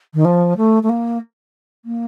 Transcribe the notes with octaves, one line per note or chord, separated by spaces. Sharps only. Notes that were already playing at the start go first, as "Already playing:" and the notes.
D#3
F3
A3
A3
A#3
A#3